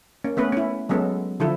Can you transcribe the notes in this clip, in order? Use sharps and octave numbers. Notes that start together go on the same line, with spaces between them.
A#3 C#4
A3 B3 C#4 B4
C#4 E4
F#3 G#3 B3 C#4 A4
D3 F3 E4 A4